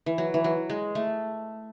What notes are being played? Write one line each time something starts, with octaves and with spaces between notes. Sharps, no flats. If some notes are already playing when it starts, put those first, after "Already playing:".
E3
F#3
E3
F#3
G#3
A3